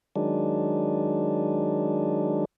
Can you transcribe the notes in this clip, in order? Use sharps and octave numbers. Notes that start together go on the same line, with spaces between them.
D#3 F#3 G#3 D4